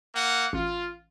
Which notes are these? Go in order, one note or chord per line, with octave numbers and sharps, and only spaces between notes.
A#3 F#5
A1 F4